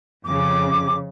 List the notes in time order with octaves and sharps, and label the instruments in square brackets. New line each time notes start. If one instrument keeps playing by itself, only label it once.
[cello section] F2 C#3 [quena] D6